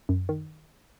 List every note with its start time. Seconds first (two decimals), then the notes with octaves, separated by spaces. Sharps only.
0.09 F#2
0.29 D#3